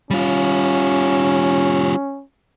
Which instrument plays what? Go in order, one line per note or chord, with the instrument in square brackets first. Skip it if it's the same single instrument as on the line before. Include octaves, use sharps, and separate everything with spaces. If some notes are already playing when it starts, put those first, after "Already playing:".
[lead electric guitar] G3 F4 [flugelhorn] C#4